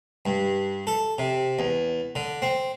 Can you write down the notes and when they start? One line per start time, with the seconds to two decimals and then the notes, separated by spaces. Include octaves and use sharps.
0.26 G2
0.87 A4
1.18 C3
1.59 E2
2.15 D3
2.42 C4